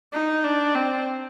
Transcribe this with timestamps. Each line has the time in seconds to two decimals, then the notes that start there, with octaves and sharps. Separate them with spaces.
0.13 D#4
0.44 D4
0.75 C4